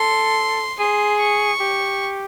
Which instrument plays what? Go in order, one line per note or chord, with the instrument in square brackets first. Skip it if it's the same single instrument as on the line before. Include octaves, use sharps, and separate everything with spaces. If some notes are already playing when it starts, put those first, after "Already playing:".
Already playing: [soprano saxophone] A4 [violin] C6
[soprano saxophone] G#4 [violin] C6
[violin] C#6
[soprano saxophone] G4